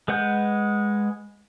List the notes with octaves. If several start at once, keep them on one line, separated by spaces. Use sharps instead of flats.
G#3 B4 F#5 G6